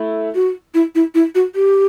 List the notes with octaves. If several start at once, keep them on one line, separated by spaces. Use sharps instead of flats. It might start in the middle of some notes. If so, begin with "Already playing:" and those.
Already playing: A3 E4
F#4
E4
E4
E4
F#4
G4